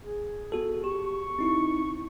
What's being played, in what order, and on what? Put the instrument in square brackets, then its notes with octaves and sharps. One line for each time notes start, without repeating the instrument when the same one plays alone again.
[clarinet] G#4
[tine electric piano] B3 F#4 A4
[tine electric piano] G4 [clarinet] C#6
[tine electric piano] C4 D#4 E4